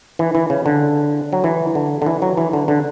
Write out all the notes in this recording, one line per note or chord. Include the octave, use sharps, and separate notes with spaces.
E3
E3
C#3
D3
F#3
E3
D3
D3
E3
F#3
E3
D3
D3